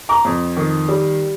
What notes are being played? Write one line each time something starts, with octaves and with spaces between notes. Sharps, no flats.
A#5 D6
F2
D#3
G3